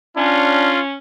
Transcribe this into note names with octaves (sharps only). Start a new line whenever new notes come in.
C#4 D4 F4